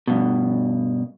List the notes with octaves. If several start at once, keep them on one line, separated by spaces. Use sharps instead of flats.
G2 B2